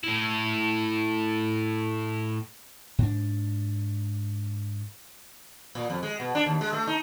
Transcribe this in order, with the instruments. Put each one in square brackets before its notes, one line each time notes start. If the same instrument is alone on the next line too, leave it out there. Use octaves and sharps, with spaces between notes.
[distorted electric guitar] A2 E4
[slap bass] G#2 D4
[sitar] A#2
F2
G#3
B2
D4
D#2
G#3
A3
D#4